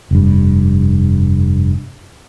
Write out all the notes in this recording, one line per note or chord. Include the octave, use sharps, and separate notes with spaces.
F1 G2